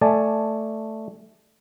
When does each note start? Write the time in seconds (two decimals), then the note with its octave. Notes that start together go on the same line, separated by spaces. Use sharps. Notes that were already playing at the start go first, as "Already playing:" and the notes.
0.01 A3 D5 G#5 A5